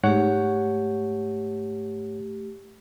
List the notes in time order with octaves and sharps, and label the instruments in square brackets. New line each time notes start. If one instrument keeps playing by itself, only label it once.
[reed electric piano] G#2 C#5 F#5 [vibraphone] A3 G4